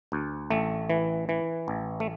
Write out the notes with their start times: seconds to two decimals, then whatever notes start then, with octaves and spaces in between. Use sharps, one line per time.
0.12 D2
0.50 A1 A3
0.90 E3
1.29 E3
1.68 A1
2.00 A3